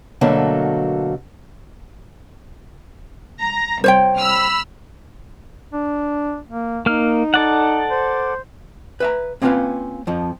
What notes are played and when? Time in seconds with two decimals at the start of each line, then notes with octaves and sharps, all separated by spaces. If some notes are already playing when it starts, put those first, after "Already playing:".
0.21 B2 D3 F#3 A3 A#3 A4
3.37 A#5
3.84 C2 C5 C#5 G5
4.17 B5 E6 F6
5.73 D4
6.47 A#3
6.86 A#3 D#4 F6
7.34 A4 D5 F#5
7.90 C5
9.00 B4 E5 A#5
9.42 A#3 C4 C#4 F4 B4 F5
10.07 F2 F3